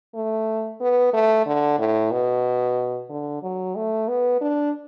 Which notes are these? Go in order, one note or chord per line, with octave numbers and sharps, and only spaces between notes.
A3
B3
A3
D3
A2
B2
D3
F#3
A3
B3
D4